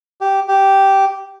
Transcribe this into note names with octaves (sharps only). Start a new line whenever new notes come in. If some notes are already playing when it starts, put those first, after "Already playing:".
G4
G4